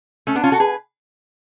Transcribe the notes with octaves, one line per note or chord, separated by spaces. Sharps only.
A3 C#4
B3 D4
C#4 F4
F#4 A4
G#4 B4